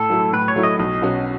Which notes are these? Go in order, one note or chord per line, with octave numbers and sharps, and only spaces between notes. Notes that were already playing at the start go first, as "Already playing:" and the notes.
Already playing: A2 A4
F#3 A3 E4
A2 B4
C#5
F#3 A3 E4
D#5
B1 D#5
B2 F#3 C#4 F#4